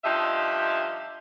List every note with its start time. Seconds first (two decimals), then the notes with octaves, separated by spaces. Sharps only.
0.04 G2 F3 D#4 G4 D#5 E5